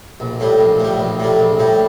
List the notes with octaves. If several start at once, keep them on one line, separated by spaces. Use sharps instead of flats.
A#1
A2 G3
A#1
A2 G3
A#1
A2 G3
A#1
A2 G3